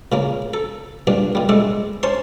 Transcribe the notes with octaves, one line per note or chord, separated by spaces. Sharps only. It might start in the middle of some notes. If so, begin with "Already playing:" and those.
A#2 C#3 A#3
A4
G2 A#2 D4
A#2 G3
G#3 A3 D4 A4
C#4 C5 A5 C6